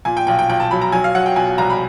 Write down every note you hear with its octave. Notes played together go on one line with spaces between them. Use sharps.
A#2 G#5
G5
B1 G5
G5
B1 G5
A5
F#3 B5
A#5
F#3 G#5
F5
F#3 F#5
G5
B2 G#5
C2 A#5
B5